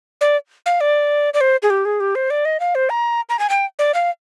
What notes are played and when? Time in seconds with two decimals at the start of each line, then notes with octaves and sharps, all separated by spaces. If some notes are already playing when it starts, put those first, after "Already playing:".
0.21 D5
0.66 F5
0.81 D5
1.34 D5
1.41 C5
1.63 G#4
1.70 G4
1.85 G#4
2.00 G4
2.15 C5
2.30 D5
2.45 D#5
2.60 F5
2.75 C5
2.90 A#5
3.29 A#5
3.39 G#5
3.50 G5
3.79 D5
3.94 F5